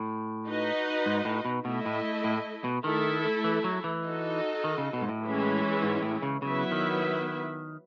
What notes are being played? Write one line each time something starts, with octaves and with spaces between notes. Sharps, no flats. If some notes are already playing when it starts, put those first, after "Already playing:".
Already playing: A2
D#4 F#4 B4 D#5
G#2
A2
B2
B2 A3 E4 A4 D#5
A2
A2
B2
D#3 A3 E4 A4
E3
F#3
E3
D#4 F#4 A4 D#5
D#3
C#3
B2
G#2
A2
E3 G#3 C#4 E4
G#2
A2
C#3
C#3 F#3 B3 E4 B4 E5
D#3